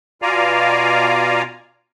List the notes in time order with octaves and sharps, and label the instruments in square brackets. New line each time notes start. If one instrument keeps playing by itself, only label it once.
[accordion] B2 F4 D5 F5 G#5 A#5